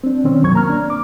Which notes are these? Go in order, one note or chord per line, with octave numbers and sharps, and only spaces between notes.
C4 D4
B2 D#3 C4 C#4
C2 F#2 F#3 C#6 G#6
A#3 A#5 F6
D4
D6